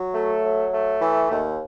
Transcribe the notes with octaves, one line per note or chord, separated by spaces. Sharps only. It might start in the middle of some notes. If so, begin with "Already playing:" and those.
Already playing: F#3
A3
F#3
A3
E3
D#2